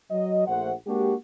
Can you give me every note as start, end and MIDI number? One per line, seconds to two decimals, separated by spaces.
0.11 0.46 54
0.11 0.46 75
0.47 0.72 34
0.47 0.72 57
0.47 0.72 72
0.47 0.72 78
0.86 1.13 56
0.86 1.13 58
0.86 1.13 62
0.86 1.13 66
0.86 1.13 67